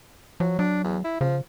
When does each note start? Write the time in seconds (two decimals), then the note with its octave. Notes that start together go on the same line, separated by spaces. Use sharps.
0.40 F3 F#3
0.59 F#3 D4
0.84 E2
1.04 E4
1.21 C#3 F3